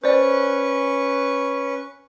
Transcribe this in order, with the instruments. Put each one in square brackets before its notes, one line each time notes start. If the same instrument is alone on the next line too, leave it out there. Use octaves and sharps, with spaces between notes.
[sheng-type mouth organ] C#4 B4 C#6 [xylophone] C5 D5